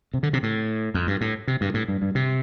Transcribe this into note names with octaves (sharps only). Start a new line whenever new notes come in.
C3
D3
C3
A2
F2
G2
A2
C3
G2
A2
G2
G2
C3